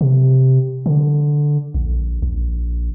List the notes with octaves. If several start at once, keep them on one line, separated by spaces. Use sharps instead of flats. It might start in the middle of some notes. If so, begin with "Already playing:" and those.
C3
D3
A#1
A#1